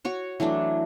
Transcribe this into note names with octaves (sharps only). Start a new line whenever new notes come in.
F#4 C#5 C#6
E3 F#3 A3 D4